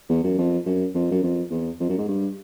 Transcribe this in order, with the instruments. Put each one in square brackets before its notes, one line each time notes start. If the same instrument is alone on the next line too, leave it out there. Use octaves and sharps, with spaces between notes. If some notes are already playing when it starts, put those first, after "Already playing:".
[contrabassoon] E2
F#2
F2
F#2
F2
F#2
F2
E2
F2
F#2
G#2
G2